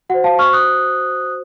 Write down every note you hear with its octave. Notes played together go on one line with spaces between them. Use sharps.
F#4 C5 F#5
F5 A5
C#6 F6
D#6 F#6